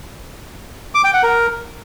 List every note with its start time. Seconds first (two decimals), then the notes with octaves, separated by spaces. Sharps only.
0.95 D6
1.04 G5
1.14 F#5
1.23 A#4